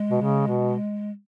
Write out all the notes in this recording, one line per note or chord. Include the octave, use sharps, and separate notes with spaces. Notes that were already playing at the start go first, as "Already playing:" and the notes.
Already playing: G#3
B2
C#3
B2